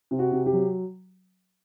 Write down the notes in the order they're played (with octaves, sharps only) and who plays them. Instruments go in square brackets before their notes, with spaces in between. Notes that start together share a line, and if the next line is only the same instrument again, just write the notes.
[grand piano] C3
F#4
C3
G4
F#3